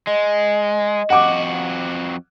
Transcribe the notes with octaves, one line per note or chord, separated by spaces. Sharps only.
G#3 D#5
F2 F#4 F#5 D6